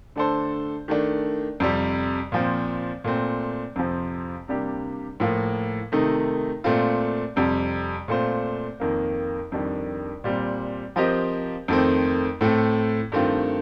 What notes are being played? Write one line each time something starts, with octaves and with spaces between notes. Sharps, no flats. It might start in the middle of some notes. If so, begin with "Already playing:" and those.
D3 A3 D4 A4 C5
D#3 A3 D4
F2 C3 G3
A#2 F3 C4
A#2 A3 C4
F2 C3 F3 C4
C3 G3 A#3 D4 G4
A2 F3 A#3 F4
C3 D#3 A3 D#4
A#2 A3 C4 F4
F2 C3 G3
A#2 A3 C4 F4 C5
F2 D#3 A#3
F2 D#3 G3 D4
A#2 G3 C4
F3 C4 G4 A#4 D#5
F2 D#3 A3 C4
A2 A3 C4
G2 D#3 A3 C4 F4